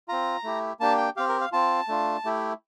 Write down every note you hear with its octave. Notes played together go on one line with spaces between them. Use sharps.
C4 F4 A#5
A3 E4 G4
A#3 D4 G4 A5
G5
C4 G4 F5
A#4
F5
C4 F4 A5
A3 D4 F4
A3 E4 G4